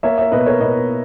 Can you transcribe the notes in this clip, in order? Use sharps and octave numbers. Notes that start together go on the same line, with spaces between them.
A#3 C#5 E5
C#5 E5
B2 B4 D#5
A#4 C#5
B2 B4 D#5